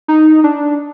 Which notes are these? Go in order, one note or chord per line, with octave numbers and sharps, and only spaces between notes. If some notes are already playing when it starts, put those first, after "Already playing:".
D#4
D4